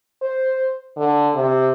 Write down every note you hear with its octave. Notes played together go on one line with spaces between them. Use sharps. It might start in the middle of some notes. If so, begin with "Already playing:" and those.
C5
D3
C3